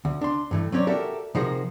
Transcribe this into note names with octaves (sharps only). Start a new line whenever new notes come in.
D2
D4 C6
G2 E3 A3
F#3 C4 C#4 C#5 D5
F#4 G4 A4 A#4 D5 E5
C3 F3 D#4 F#4 G#4 A#4